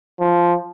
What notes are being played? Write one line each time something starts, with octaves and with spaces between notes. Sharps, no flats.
F3